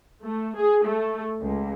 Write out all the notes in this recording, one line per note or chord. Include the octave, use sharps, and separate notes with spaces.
A3
G#4
A3
C#2